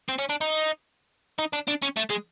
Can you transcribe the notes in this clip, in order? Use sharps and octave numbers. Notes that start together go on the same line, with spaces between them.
C4
C#4
D4
D#4
D#4
D4
D4
C#4
A3
G#3